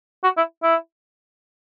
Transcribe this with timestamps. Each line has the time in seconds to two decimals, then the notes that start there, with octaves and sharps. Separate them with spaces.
0.24 F#4
0.37 E4
0.63 E4